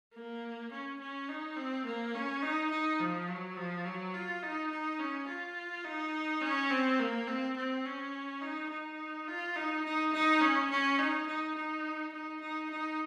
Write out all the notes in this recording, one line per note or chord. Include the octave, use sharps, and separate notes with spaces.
A#3
C#4
C#4
D#4
C4
A#3
C#4
D#4
D#4
F3
F#3
F3
F#3
F4
D#4
D#4
C#4
F4
D#4
C#4
C4
A#3
C4
C4
C#4
D#4
D#4
F4
D#4
D#4
D#4
C#4
C#4
D#4
D#4
D#4
D#4
D#4
D#4